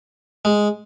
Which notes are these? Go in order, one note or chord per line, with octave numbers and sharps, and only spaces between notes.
G#3